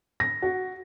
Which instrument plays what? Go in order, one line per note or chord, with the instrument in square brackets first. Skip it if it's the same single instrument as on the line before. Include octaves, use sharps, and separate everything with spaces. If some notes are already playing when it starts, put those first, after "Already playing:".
[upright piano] A#6
F#4